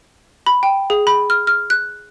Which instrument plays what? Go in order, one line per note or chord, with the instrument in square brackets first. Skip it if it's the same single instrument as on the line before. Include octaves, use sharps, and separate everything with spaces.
[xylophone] B5
G5
G#4
B5
F6
F6
F#6